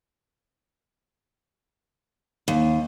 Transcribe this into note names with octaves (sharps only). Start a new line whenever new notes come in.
D#2